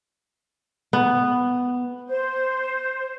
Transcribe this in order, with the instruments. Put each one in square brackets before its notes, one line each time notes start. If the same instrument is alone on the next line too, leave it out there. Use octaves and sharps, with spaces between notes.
[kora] B3
[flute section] C5